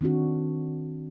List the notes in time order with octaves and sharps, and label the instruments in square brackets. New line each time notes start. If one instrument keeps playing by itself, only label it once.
[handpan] D#3 C4 D4 F#4